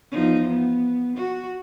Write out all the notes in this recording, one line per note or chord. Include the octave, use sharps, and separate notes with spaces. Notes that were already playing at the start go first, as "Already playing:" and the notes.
E2 F3 D#4
B3
F#4